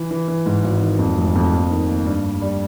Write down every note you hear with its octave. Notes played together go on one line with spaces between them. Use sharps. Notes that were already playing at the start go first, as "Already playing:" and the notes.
Already playing: E3
E3
E3
G#2
G#1
D#3
F2
F1
F2
D#2
D#3
D#2
G2
G2
G3